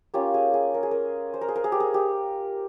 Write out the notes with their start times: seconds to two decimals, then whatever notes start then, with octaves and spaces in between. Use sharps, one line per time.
0.14 A#3 C#4 F4 G4
0.34 G#4
0.54 G#4
0.74 A#4
0.83 G#4
0.91 A#4
1.34 C5
1.41 A#4
1.48 G#4
1.56 A#4
1.64 G#4
1.72 G4
1.80 G#4
1.94 G4